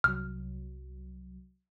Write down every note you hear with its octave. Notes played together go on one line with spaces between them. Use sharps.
C2 F#3 F6